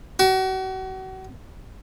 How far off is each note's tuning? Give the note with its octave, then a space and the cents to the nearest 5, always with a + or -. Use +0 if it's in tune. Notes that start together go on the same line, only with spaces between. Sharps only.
F#4 +35